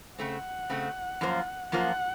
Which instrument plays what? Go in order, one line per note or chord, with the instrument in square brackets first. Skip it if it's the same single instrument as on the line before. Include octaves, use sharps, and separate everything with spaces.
[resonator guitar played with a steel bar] C#3 A3 C4 [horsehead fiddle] F#5
[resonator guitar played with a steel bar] C#3 A3 C4
F#2 F3 A#3 F4 C5
[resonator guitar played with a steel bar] F#2 F3 A#3 F4 C5 [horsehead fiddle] F#5